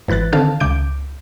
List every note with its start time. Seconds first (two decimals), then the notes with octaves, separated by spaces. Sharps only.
0.08 G#1 E3 B4 F#6 A6
0.33 D3 D#3 C4 A4 F5 A5
0.60 C#2 D6 G6 D7